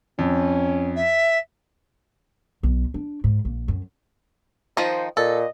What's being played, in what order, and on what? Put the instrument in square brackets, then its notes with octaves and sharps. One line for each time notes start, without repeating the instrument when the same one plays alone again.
[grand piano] F2 [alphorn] C#4
[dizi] E5
[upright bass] B1
D4
G#2
A#1
F#2
[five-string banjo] D#3 F3 D#4 [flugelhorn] C5
[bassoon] A#2 [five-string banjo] A4 [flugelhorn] D#5